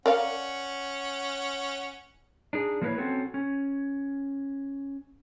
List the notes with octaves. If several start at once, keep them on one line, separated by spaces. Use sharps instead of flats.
C#4 A#4 D5 F5 F#5
D4 D#4 G#4
F3 A#3 E4 A4 B4 C#5
C4 C#4 F#4 A4
C#4